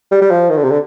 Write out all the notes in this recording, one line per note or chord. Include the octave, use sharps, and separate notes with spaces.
G3
G3
F3
D#3
D3
C3
D3